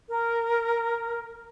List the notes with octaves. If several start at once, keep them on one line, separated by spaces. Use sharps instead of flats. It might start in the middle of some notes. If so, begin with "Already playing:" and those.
A#4